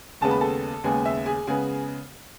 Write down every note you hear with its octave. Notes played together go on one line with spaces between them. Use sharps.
D#2 C#3 G#3 B3 A5
B5
A4 A5
D#2 C#3 G#3 B3 G#4 G#5
E5
G#4 G#5
C#3 G#3 B3 G#4 G#5